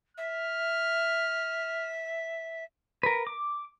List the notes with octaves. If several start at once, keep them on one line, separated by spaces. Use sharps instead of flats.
E5 F6
A#4 B4
D6